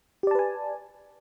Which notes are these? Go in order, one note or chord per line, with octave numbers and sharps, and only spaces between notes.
G4 B4 D5 G#5 A5